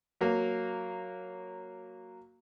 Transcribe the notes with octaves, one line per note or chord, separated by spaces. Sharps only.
F#3 A#3